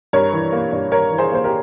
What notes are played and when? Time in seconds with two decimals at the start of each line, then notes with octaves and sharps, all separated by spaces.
0.13 G2 A#4 C#5
0.33 E3
0.52 A#3
0.72 G2
0.92 G2 A#4 C#5
1.12 E3
1.18 G#4 C5
1.32 A#3 C5
1.44 G4 A#4